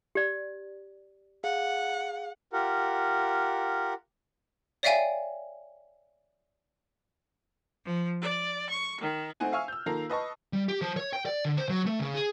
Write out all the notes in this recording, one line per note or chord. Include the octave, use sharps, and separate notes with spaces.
G4 D5
G#4 F5 F#5
F4 G4 A#4 F#5
C#5 D5 E5 F5 G5 G#5
F3
D5
C#6
D#3
A3 C4 D#4 F#5 G#5
E5 F5 G#5 C#6 E6 F6
E6 G6
D#3 A#3 F4 A4 A#5 C7
B4 D#5 A5 C#6
G3
G4
F3
C#5
G5
D5
D3
C5
F#3
A3
C#3
G#4